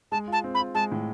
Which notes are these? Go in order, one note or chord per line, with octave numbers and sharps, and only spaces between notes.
G#3 A5
F4 A5
C4
B5
F4
G#3 A5
A2